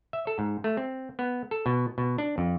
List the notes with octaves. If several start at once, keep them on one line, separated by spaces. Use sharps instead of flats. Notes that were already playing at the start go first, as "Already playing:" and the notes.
E5
A4
G#2
A3
C4
B3
A4
B2
B2
D4
F2